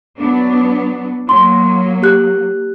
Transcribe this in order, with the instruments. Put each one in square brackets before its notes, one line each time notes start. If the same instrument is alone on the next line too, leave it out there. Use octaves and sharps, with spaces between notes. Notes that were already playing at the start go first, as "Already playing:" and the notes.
[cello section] F#3 B3 D4
[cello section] F#3 A#3 [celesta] C6
[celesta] G4 F#6